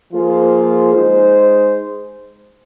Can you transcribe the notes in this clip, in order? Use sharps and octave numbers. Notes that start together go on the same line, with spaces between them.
F3 A#3 F4 G#4 C5
G#3 D#4 G#4 C5